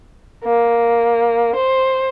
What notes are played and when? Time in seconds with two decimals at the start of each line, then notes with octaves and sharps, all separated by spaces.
0.44 A#3
1.55 C5